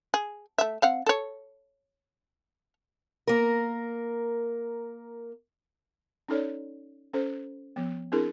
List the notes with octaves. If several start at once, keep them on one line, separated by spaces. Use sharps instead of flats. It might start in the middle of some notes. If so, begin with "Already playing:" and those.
G#4
A3 E5
C4 F5 F#5
A4 C#5
A#3 A#4
C#4 D#4 A4 C#5 D5
C#4 A4 C5
F3 B3
C4 D4 E4 G#4 A#4